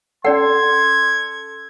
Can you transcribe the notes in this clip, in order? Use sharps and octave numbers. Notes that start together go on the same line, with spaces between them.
C#4 A4 D5 F#5 C6 G#6